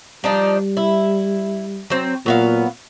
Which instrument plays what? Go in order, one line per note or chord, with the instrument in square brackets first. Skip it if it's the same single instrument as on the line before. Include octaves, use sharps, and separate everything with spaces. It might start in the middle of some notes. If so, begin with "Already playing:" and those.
[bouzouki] F3 D4 D#4 [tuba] G3
[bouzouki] E4
F#3 C4
[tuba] A#2 [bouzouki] F#3 B3 F5